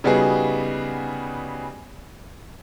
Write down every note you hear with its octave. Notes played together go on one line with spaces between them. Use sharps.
C#3 G3 B3 D#4 F#4 G#4